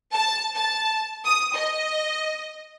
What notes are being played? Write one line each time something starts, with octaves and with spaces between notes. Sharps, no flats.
A5
A5
D#6
D#5